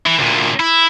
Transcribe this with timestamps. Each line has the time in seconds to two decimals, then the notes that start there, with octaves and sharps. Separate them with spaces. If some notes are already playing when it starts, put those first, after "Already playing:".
0.06 E3
0.19 D2 A#2
0.60 E4